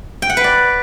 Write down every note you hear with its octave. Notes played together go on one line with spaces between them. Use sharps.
G5
F#5
B4
D5